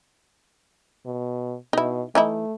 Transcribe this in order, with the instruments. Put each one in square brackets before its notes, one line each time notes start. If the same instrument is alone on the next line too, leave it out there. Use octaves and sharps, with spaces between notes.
[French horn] B2
[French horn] B2 [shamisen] D#4 E4
[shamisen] E3 D#4 E4 [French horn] A3